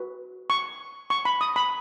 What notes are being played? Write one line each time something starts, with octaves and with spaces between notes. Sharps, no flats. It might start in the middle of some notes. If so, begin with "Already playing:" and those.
Already playing: F#4 B4
C#6
C#6
B5
D#6
B5